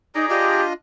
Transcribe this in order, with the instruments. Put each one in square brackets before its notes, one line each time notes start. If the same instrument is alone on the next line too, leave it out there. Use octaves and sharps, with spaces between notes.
[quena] D#4 [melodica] G#4 D5 A#5
[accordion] D4 F4 D#5 [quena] G4